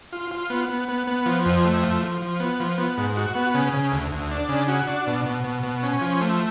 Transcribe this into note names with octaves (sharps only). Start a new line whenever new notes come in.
F4
F4
B3
B3
B3
B3
F3
F2
A3
F3
F3
F3
B3
F3
B3
G#2
F#4
B3
C#3
C#3
D2
D2
D4
C#3
F#4
D4
B2
B2
B2
B2
C#4
F3
A3